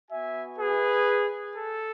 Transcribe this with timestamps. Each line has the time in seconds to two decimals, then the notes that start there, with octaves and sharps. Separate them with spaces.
0.10 B3 F#4 E5 G#5
0.58 G#4 B4
1.55 A4